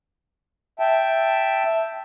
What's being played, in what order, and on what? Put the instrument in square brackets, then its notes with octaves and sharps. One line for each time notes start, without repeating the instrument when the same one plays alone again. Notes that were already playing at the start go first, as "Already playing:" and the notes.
[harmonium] E5 G5 A5